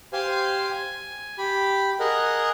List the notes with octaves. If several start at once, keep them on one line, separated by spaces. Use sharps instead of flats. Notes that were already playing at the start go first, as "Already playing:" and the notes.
G4 C5 F5 G#5 C6
G#5
G4 B5
G#4 A#4 D#5 F#5